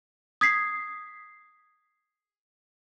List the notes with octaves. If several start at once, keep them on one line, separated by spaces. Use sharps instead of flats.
D#6 G#6 B6 C7